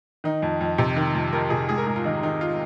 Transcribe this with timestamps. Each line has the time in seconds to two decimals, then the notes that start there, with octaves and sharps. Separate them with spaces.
0.24 D#3 D#4
0.42 F2
0.61 F2
0.78 C3
0.96 D#3
1.15 F2
1.33 F2 A#4
1.50 C3 G#4
1.69 G#2 G#4
1.78 A#4
1.86 G#2 G#4
1.96 F4
2.05 D#3 D#4
2.23 D#3 D#4
2.41 F4